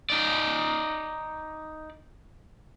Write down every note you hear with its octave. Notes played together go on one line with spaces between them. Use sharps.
D#4 D5